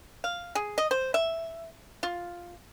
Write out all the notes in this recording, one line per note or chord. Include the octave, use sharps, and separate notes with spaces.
F5
G#4
D#5
C5
E5
F4